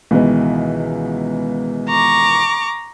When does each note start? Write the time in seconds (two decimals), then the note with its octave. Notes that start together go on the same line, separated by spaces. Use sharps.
0.11 C#2 B2 D#3 E3 B3
1.89 A#5 C#6 D6